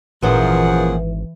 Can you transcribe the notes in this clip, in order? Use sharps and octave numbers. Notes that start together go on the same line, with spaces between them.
G#1 F#2 A#2 E3 F3 G#4 F#5